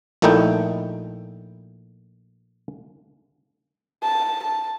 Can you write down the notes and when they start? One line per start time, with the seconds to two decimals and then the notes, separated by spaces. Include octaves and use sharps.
0.22 A#1 A#2 A3 D#4 E4 G5
4.03 A5
4.44 A5